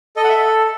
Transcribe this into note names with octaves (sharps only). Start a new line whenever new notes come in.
A4 D#5
F#5
E5